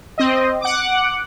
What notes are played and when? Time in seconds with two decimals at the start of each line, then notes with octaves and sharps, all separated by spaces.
0.18 C4 D#5
0.61 F#5 D6